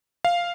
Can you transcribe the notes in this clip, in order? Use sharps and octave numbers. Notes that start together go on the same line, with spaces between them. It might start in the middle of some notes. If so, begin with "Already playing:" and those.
F5